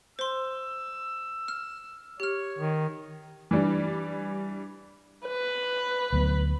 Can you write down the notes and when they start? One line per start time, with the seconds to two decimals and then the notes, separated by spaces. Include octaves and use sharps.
0.19 C5 C6 E6
1.48 F6
2.20 G4 C#5 F6
2.58 D#3
3.51 E3 G3 D4
5.27 B4
6.13 D2 F#3 B3